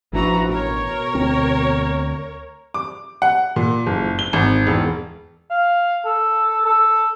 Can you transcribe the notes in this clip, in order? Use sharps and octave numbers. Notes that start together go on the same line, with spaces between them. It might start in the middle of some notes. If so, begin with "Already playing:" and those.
A1 E3 F3 D4 F#4 A#5
B2 A#4 C#5
D2 C4
D6
F#5
A#2
F#1
G7
G#1
E1
F5
A4
A4